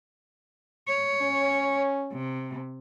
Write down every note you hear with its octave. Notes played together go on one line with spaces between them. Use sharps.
C#5
C#4
C3